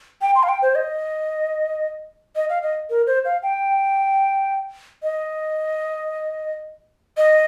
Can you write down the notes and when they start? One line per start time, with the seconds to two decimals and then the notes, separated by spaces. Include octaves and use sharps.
0.22 G5
0.35 C6
0.43 F5
0.49 G5
0.62 C5
0.75 D#5
2.36 D#5
2.49 F5
2.63 D#5
2.90 A#4
3.07 C5
3.25 F5
3.43 G5
5.03 D#5
7.17 D#5